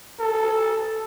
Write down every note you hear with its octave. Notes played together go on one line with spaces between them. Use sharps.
A4